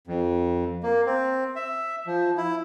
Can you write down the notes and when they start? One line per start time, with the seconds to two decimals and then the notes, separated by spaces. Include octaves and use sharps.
0.07 F2
0.83 A#3
1.06 C4
1.56 E5
2.06 F3
2.37 E4